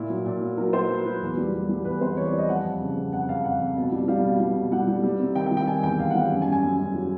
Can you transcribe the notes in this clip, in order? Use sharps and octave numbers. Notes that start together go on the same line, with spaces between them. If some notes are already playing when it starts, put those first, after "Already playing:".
Already playing: A#2 E4
F#3
A#2
F#3
F#3 A#4
F#3 C5
F#3 B4
F#3 B4
E2
G3
G3
G3
E2 B4
C3 C5
E3 C#5
D5
G3
D#5
F3 F#5
F2
C#3
F2
F2 F#5
F2 F5
F2 F#5
F2
B2
G3
G3 F5
B2
G3
B2
G3 F#5
G3
G3
C3
D#3 G5
G5
G3
G5
D#3 G#5
E2 G5
E2 F5
F#5
G3
G5
F#2
G#5
F#2
G#5
F#2
F#2
F#3